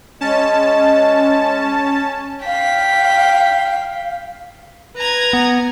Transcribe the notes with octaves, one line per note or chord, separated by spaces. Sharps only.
G#3 C#4 A5
F5 G5 B6
B4 A#5 G#6
B3